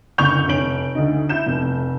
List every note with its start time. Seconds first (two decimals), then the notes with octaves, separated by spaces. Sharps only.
0.18 F#1 D2 C#6 G6 F7
0.48 F1 C3 C#5 D7 F#7
0.95 D2 D#4
1.29 E4 G6 E7
1.46 F1 F2